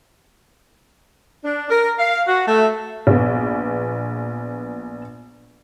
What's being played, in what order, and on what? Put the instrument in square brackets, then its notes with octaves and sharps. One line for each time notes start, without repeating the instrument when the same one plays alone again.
[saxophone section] D4
A#4
F5
F#4
A3
[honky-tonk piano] A#1 B3